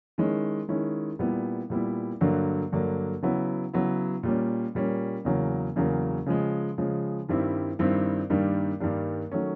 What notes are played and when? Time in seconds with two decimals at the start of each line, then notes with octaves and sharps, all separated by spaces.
0.18 D#3 G#3 C#4 E4
0.68 D#3 G#3 C#4 E4
1.19 A#2 G3 B3 E4
1.70 A#2 G3 B3 E4
2.21 G2 D3 F#3 A#3
2.72 G2 D3 F#3 A#3
3.22 C#3 F#3 B3 E4
3.73 C#3 F#3 B3 E4
4.23 A#2 G3 A#3 C#4
4.75 A#2 G3 A#3 C#4
5.25 E2 C#3 F#3 A#3
5.76 E2 C#3 F#3 A#3
6.26 C#3 F3 G#3
6.78 C#3 F3 G#3
7.28 G2 D#3 G3 C4 E4
7.79 G2 D#3 G3 C4 E4
8.30 G2 D#3 G3 A#3 D4
8.80 G2 D#3 G3 A#3 D4
9.32 D#3 F#3 A3 C#4